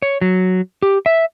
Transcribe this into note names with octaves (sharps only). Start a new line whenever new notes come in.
C#5
F#3
G4
E5